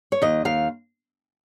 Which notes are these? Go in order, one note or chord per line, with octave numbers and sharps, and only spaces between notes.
C#5
D#2 D#5
D#2 F5